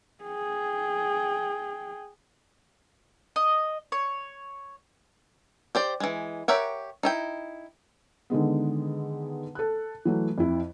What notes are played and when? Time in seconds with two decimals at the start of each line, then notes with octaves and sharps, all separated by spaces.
0.24 G#4 G5
3.36 D#5
3.92 C#5
5.75 G4 C5 D5
6.00 E3 G#3
6.48 G4 A#4 C#5 E5 F#5
7.03 D#4 E4 G5
8.30 D3 D#3 G#3 B3
9.55 A4 F#6
10.05 E3 F#3 A3
10.38 F2 E4